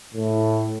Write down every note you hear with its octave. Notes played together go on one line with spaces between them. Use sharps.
A2